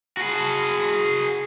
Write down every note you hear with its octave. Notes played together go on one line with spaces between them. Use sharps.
F#4 G#4